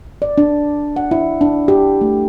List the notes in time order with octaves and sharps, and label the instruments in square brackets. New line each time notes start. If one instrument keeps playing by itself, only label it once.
[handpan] D5
D4
F#5
E4
D4
G4
A3